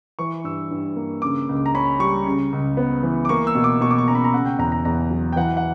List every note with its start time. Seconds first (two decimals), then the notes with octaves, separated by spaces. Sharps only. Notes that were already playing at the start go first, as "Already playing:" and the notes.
0.19 E3 C#6
0.44 G2 E6
0.71 G2
0.96 A#3
1.22 C#3 D6
1.49 C#2
1.66 A#5
1.75 C#4 B5
2.00 G3 C#6
2.26 C#3
2.52 C#2
2.77 B3
3.03 E3
3.25 D6
3.29 A#3 C#6
3.47 E6
3.55 B2
3.64 D6
3.81 B2 C#6
3.91 D6
3.98 C#6
4.08 C#4 A#5
4.15 B5
4.24 A#5
4.33 C#3 F#5
4.46 G5
4.59 E2 A#5
4.72 A#5
4.85 E2 A#5
5.11 F#3
5.33 G5
5.36 E3 F#5
5.57 F#5